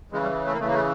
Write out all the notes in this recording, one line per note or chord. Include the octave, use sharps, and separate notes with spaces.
C#3 E3 G#3
G3
A3
A#3
C#3 E3 A3
A#3
A3